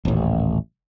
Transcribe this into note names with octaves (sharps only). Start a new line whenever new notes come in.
D#1 A1